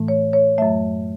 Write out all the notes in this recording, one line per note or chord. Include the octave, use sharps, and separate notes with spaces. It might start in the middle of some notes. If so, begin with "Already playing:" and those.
Already playing: A2 E3 A3
C#5
C#5
F#2 F#3 A3 E5